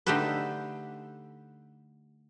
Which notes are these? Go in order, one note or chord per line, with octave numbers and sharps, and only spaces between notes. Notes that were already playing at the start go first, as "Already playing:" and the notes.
D3 A3 D#4 G4 A4 B4